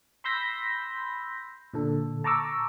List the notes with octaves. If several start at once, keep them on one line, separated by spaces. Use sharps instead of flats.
B5 C6 E6 G6 A#6 B6
A#2 D3 A4
A5 A#5 C#6 D6 E6